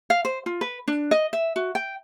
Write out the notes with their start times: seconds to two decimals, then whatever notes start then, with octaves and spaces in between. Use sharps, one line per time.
0.10 F5
0.25 C5
0.46 F4
0.61 B4
0.88 D4
1.11 D#5
1.33 E5
1.56 F#4
1.75 G5